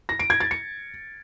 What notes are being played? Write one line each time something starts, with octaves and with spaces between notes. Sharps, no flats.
A#6
D7
G#6
A6
C#7